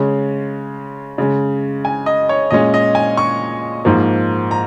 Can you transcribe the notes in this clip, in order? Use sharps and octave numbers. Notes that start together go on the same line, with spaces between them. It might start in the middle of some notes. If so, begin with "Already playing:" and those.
Already playing: C#3 G#3 C#4
C#3 G#3 C#4
G#5
D#5
C#5
A#2 G#3 C#4 D#5
D#5
G#5
C#6
G#2 F3 A#3
A#5